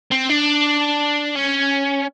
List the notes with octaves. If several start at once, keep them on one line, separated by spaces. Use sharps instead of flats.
C4
D4
C#4